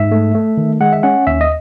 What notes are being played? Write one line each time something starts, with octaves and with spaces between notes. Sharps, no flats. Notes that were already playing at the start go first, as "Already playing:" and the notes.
Already playing: G#2 E5
A3
A3
D#3
G#3 F#5
E5
C#4 F#5
D#2 E5
D#5